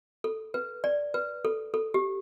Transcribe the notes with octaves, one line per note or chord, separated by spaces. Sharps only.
A4
B4
D5
B4
A4
A4
G4